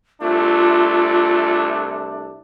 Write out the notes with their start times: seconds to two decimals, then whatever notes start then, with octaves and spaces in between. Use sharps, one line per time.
0.22 C2 A3 D4 F4